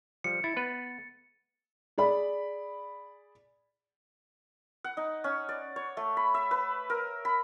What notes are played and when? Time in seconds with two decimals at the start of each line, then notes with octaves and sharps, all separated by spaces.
0.24 F3 G3 C#7
0.44 E4 A6
0.56 B3 B4
1.98 G#4 D5 B5
4.84 F#5
4.97 D#4
5.24 C#4
5.49 D5
5.76 C#5
5.97 A3
6.17 B5
6.34 E5
6.51 B4
6.90 A#4
7.25 B5